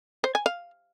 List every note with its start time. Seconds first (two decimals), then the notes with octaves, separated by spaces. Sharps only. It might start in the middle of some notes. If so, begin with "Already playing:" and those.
0.24 C5
0.35 G#5
0.46 F5